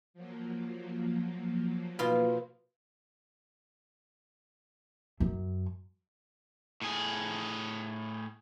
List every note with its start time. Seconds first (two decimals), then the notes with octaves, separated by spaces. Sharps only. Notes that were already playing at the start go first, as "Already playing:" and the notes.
0.14 F3 F#3 A#3
1.99 B2 F4
5.20 F#2
6.82 A2 G#4